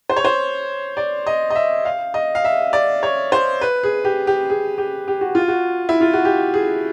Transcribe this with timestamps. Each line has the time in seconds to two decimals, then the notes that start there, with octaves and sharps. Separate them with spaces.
0.09 C5
0.16 C#5
0.24 C5
0.97 D5
1.26 D#5
1.50 D#5
1.55 E5
1.85 F5
2.14 D#5
2.35 F5
2.45 E5
2.73 D5
3.03 C#5
3.32 C5
3.61 B4
3.83 G#4
4.05 G4
4.27 G4
4.50 G#4
4.78 G4
5.08 G4
5.21 F#4
5.35 F4
5.48 F#4
5.89 E4
6.01 F4
6.13 F#4
6.25 G4
6.54 G#4